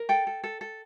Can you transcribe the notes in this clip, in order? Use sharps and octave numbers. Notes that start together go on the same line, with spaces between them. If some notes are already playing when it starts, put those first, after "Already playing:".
Already playing: A#4
A4 G5
A4
A4
A4